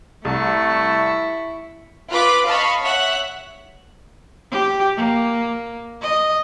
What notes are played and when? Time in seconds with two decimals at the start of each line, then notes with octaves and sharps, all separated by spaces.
0.25 C2 A3 E4 A5 C#6
2.10 F4 B4 B5 D6 F#6
2.47 D#5 F5 A5 B5 C#6
2.81 C#5 E5 F#5 F#6
4.51 G4
4.96 A#3
6.01 D#5